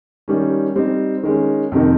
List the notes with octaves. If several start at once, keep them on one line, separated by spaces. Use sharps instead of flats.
D#3 G3 C#4
G3 C4 D#4
D#3 G#3 C#4
F2 C3 D#3